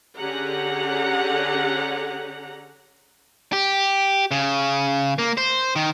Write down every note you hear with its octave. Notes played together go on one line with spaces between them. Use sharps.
D3 C#4 G4 G#4 F#5 A#5
G4
C#3
A#3
C5
D#3